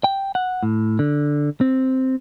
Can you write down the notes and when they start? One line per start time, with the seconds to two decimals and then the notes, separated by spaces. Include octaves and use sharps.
0.04 G5
0.35 F#5
0.63 A2
0.99 D3
1.61 C4